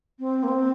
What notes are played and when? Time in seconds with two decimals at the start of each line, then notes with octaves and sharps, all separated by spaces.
0.20 C4
0.43 A#3
0.48 C4